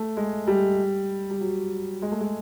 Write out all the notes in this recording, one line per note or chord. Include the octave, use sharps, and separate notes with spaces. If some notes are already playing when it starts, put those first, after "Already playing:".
Already playing: A3
G#3
G3
G3
F#3
G#3
A3
G#3